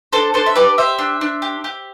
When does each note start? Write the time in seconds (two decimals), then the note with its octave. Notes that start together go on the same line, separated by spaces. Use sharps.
0.13 D4 A4 C5
0.34 D4 A4 C5
0.46 E5
0.56 G4 B4 D5
0.78 G4 C5 E5
0.99 D4
1.21 D4
1.42 G4
1.64 G4